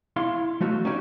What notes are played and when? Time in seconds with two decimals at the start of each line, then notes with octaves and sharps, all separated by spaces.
0.16 E4 F5 C6
0.61 F#3 A3 F4 F#4
0.85 C#4 D#4 F#4 G4 C#5